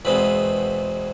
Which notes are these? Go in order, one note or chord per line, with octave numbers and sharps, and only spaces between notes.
E2 B2 G#3 C4 B5